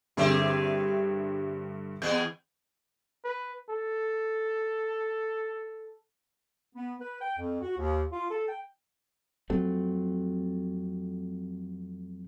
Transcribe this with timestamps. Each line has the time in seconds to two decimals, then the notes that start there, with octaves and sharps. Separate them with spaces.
0.17 G2 D3 C4 G4 G#4 E5
2.02 E2 B3 G#4 G6
3.24 B4
3.70 A4
6.76 B3
7.00 B4
7.22 G5
7.39 F2
7.62 F#4
7.78 D#2
8.13 F4
8.31 A4
8.49 G5
9.50 F2 F#3 A3 C4